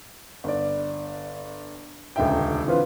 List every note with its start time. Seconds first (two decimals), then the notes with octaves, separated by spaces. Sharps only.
0.44 G1 D5
2.16 D#1 C#2 D3 E5 G5
2.66 D3 E3 C4 F4 B4